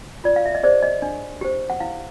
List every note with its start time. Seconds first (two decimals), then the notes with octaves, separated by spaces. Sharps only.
0.24 F4 D5
0.36 F5
0.45 E5
0.55 D#5
0.63 G#4 C5 D5
0.82 D#5
1.02 D4
1.41 G4 C5
1.70 F#5
1.80 E4 F5